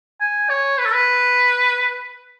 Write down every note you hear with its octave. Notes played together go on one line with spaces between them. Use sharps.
G#5
C#5
B4
A4
B4